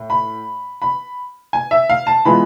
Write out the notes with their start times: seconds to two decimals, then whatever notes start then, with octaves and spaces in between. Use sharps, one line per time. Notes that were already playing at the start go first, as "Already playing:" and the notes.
Already playing: A2
0.10 B5
0.82 B5
1.53 G#5
1.71 E5
1.90 F5
2.07 A5
2.25 E3 G#3 B3 F4 B5